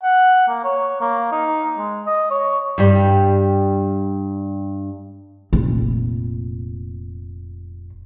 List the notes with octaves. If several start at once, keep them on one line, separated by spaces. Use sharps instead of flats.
F#5
A#3
C#5
A#3
D#4
G#3
D#5
C#5
G2 G3
F1 A#2